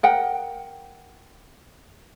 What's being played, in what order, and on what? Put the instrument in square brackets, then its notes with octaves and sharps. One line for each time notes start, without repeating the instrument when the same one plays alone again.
[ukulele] A#4 F#5 G5